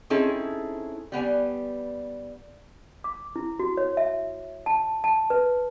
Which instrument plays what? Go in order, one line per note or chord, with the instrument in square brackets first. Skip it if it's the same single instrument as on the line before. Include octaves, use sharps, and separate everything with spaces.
[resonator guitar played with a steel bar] C4 C#4 D#4 E4 G#4 A4
G3 B3 D5 G#5
[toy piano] D6
E4
F#4
C#5
E5
A5
A5
B4